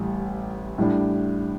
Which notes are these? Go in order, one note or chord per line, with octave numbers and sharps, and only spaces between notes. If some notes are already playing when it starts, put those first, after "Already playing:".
Already playing: A1 A2 G3
A2 G3 D4